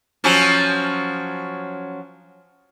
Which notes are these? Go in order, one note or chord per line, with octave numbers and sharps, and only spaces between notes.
F3 F#3 C#4